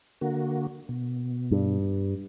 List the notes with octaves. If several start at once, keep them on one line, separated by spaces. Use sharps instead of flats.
D3 A#3 F#4
B2
G2